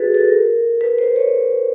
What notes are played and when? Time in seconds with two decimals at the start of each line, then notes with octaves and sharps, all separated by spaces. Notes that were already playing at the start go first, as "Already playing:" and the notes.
Already playing: F#4 G#4 A4 B4
0.14 A4
0.28 A#4
0.81 B4
0.98 C5
1.16 C#5